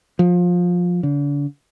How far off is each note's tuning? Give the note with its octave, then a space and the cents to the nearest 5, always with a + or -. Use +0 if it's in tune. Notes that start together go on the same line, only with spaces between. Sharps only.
F3 +20
D3 -40